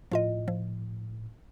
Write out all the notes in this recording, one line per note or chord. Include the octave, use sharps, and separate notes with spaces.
A2 F3 F4 D#5
F3